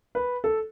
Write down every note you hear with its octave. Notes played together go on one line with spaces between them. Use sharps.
B4
A4